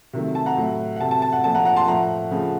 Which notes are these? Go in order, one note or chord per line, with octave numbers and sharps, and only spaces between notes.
C3 D#3 F#3 A3
A5
F#5 A#5
A2 F#3 A3
F#5
C3 F#3 A3 A5
A5
A5
F#5
A#2 F3 A3 A5
F#5 A#5
F#5 A#5
A5 C6
A2 F3 A3 F#5 A#5
C#3 F3 A3